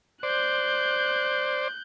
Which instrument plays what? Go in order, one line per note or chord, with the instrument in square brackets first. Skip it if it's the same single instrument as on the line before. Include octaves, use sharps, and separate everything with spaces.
[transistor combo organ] C5 D5 [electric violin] F#6 G6